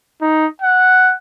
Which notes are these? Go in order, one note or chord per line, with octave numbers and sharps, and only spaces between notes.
D#4
F#5